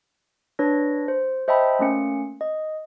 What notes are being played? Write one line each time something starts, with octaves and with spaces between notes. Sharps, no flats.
D4 B4 C#5 A#6
C5
C5 D#5 E5 G5 A5 B5
A3 A#3 C#4 C#7
D#5